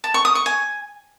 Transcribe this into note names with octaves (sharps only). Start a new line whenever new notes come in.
A5
C#6
D#6
C#6
G#5